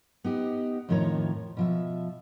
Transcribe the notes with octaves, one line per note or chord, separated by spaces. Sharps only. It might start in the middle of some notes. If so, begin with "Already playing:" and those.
B3 D#4 G4
F2 A2 D#3 F3 C#5 A#5
B2 F3 E5